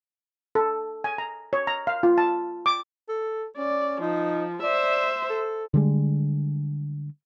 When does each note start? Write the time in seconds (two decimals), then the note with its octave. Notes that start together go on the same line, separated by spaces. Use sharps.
0.55 A4
1.04 G#5
1.18 A#5
1.53 C#5
1.67 A#5
1.87 F5
2.03 F4
2.18 A5
2.66 D6
3.09 A4
3.58 C#4 D5
4.01 F3 D#4
4.63 C5 D5 E5
5.30 A4
5.74 D3 G3 G#3